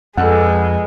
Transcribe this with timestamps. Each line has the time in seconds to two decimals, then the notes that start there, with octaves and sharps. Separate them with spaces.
0.17 F2 G#3 A4 B4 D5 F#5